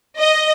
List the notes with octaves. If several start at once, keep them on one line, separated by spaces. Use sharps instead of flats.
D#5